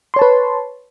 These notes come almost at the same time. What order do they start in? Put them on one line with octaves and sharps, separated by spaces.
C6 C#5 A5 B4